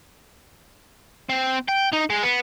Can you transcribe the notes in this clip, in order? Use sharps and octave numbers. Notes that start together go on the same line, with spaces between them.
C4
G5
D#4
G#3
B3